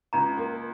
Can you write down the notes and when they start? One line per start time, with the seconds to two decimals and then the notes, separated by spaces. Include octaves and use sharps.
0.13 C#2 A#5
0.37 A#3